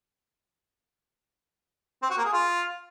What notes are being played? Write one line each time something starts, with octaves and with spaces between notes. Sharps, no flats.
C4
F#4
A#3
G#4
F4